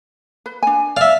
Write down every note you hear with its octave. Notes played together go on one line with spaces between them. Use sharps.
B4
D4 G#5
D5 E5 F5